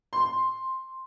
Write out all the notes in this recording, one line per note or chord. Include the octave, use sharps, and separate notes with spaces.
C6